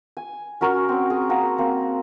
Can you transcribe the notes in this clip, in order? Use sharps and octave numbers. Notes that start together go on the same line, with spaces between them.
G#5
C#4 F#4 A#4 C#5
C4 C#4
G#4
A#3 A#4 F#5 A5
A#3 C4